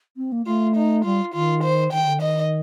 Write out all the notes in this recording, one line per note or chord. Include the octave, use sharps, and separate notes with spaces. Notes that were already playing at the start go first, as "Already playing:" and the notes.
C4
A#3
A3 F4
D#4
G3 F4
D#3 F4
C5
D#3 G5
D3
D#3 D#5